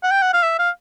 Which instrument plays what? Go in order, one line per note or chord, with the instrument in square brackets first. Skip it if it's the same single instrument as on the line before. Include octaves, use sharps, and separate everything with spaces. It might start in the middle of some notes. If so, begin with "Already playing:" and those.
[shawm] F#5
G5
F#5
F5
E5
F5